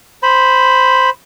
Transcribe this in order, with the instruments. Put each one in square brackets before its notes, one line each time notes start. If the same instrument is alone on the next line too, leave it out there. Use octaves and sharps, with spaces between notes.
[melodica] C5 B5